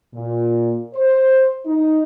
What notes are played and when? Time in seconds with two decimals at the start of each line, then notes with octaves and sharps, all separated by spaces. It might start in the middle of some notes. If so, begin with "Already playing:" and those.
0.14 A#2
0.94 C5
1.66 D#4